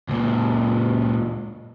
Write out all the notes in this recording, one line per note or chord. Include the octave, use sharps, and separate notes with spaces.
C#2 A#2